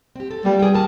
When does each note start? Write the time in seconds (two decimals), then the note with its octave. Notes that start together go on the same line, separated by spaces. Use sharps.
0.16 C4 G4
0.31 A4
0.45 G3 A#3 B3 F4
0.59 G#4 G5
0.74 D#2 A#4 A5